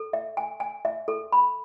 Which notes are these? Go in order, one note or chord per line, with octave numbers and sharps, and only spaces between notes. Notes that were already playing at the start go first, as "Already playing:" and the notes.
Already playing: A4
E5
G#5
G#5
E5
A4
B5